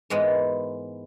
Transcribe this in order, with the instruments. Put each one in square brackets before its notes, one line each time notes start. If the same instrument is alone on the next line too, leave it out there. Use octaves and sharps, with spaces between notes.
[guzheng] G#2 E3 G#3 B3 A#4